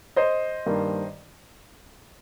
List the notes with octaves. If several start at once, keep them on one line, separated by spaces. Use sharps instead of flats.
C5 D#5
G2 D#3 A#3